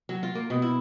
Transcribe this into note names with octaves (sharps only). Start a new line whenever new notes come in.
F#3
F4
A#3
B2
E4